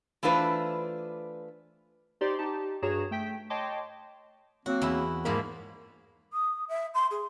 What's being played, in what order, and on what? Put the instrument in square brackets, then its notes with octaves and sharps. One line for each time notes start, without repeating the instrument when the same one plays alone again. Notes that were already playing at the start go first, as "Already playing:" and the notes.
[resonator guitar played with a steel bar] E3 A3 D4 F4 B4 C5
[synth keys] D#4 G4 C5 D5 C6 D6
D#4 G4 A5
G2 F#4 G#4 C#5 A#5 E7
A3 G5 B6
C#5 D#5 G5 A5 C6 D6
[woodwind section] F#3 A#3 C4 [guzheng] F#4
[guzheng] E2 E4
[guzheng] G#2 F3 B5 [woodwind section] A#3
[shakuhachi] D#6
E5
C6
G#4